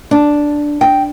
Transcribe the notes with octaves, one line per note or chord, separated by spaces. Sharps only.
D4
G5